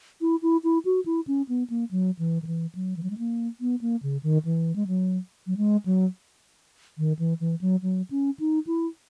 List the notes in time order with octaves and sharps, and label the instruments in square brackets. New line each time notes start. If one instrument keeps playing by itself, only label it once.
[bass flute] E4
E4
E4
F#4
E4
C#4
B3
A#3
F#3
E3
D#3
E3
F#3
E3
F#3
G#3
A#3
B3
A#3
C#3
D#3
E3
G#3
F#3
F#3
G#3
F#3
D#3
E3
E3
F#3
F#3
C#4
D#4
E4